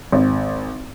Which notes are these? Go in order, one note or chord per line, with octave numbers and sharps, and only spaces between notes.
G#1